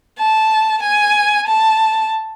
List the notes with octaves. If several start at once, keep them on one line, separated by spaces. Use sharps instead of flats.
A5
G#5
A5